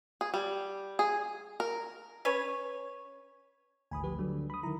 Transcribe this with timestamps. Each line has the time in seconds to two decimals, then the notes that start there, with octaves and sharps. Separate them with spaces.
0.21 G#4
0.34 G3
0.99 G#4
1.60 A#4
2.25 C#4 B4 C#5
3.91 G#1 D2 G#5 B5 D#6
4.04 F3 G4 B4
4.19 D3 F#3 G3
4.50 B5 D#6
4.63 D#3 E4 A#5